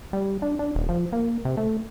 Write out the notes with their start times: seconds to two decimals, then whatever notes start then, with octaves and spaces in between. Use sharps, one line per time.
0.13 G3
0.42 D4
0.59 D4
0.75 D#1
0.89 F3
1.13 A#3
1.45 C3
1.57 A3